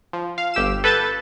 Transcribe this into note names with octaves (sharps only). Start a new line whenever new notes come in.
F3
F5
G1 G4 E6 E7
A4 B4 A5 G6 A6